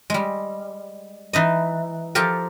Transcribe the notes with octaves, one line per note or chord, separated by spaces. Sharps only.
G3 G#3
E3 D#4 D#5
F3 G4 A4 A#4